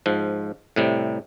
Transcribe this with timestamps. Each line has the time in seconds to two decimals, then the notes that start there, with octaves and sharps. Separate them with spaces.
0.06 G#2 F3
0.76 A2 C3 G3